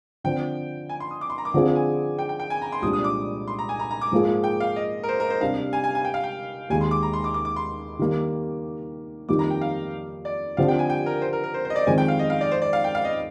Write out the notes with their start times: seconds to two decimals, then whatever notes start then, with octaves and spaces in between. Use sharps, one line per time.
0.24 D3 F3 C4 G5
0.89 G#5
1.00 C6
1.11 D#6
1.21 D6
1.30 C6
1.38 A#5
1.45 D6
1.54 D3 F3 C4 F4 G#4
1.75 G#5
2.19 G5
2.29 G5
2.40 G5
2.50 G#5
2.62 A#5
2.72 C6
2.82 C2 A#2 F3 G#3 D4 D#6
2.93 D#6
3.04 D6
3.48 C6
3.59 A#5
3.69 G#5
3.79 A#5
3.91 A#5
4.01 D6
4.12 G#2 F3 A#3 F4 G#4
4.44 G5
4.60 F5
4.76 D#5
5.03 A#4
5.09 C5
5.20 A#4
5.30 C5
5.40 C3 G3 D4 F5
5.73 G#5
5.84 G#5
5.95 G#5
6.05 G5
6.14 F5
6.24 G5
6.70 D#2 D#3 G#3 G#5
6.81 C6
6.91 D6
7.03 A#5
7.13 C6
7.24 D6
7.34 D6
7.45 D6
7.56 C6
7.99 D#3 G3 A#3
9.29 F2 D#3 G3 A#3 D#4 D6
9.39 A#5
9.50 G5
9.61 F5
10.25 D5
10.57 D3 F3 C4 G4 F5
10.68 G5
10.79 G#5
10.90 G5
11.06 A#4
11.22 C5
11.33 A#4
11.44 A#4
11.54 C5
11.65 C5
11.70 D#5
11.76 D5
11.87 F2 D#3 G#3 C4 G#5
11.98 G5
12.08 F5
12.19 D#5
12.30 F5
12.41 D5
12.52 C5
12.62 D5
12.73 F5
12.84 G5
12.95 F5
13.05 D#5